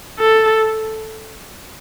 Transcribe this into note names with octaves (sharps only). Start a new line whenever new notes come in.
A4